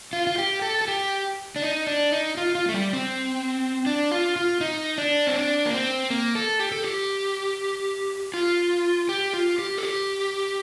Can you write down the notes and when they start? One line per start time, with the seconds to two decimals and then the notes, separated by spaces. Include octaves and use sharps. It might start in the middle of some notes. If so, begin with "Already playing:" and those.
0.13 F4
0.27 F4
0.38 G4
0.62 A4
0.81 A4
0.88 G4
1.56 D4
1.62 D#4
1.87 D4
2.12 D#4
2.37 F4
2.55 F4
2.69 A3
2.74 G3
2.93 C4
3.86 D4
4.11 F4
4.36 F4
4.61 D#4
4.98 D4
5.27 C4
5.36 D4
5.66 A#3
5.73 C4
6.10 A#3
6.35 A4
6.60 G4
6.72 A4
6.83 G4
8.34 F4
9.09 G4
9.34 F4
9.59 G4
9.78 A4
9.83 G4